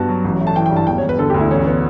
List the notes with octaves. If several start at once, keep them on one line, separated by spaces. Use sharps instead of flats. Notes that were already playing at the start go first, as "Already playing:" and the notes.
Already playing: G2 B3 F#4 A5
F#3
A1
A3
A5
E3 G5
G5
G2
A5
E1 G5
C#5
E1
B4
D3 A4
G4
D2
E4
A1 C#4
B3